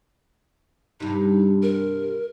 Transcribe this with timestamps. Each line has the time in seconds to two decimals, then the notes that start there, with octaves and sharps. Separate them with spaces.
1.00 G2 C3 D#4
1.62 A#4